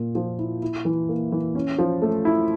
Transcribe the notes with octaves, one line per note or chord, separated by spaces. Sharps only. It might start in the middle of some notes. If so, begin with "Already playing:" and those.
Already playing: A#2 A#3
F3
E4
E4
E3
A#3
E3
C#4
F3
A3
E4